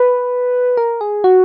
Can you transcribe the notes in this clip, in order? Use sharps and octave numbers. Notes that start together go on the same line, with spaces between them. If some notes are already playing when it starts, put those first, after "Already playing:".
Already playing: B4
A#4
G#4
F#4